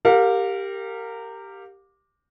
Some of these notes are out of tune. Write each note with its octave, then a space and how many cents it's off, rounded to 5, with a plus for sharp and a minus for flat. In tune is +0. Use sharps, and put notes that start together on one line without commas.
G4 +0 A#4 -20 F5 +35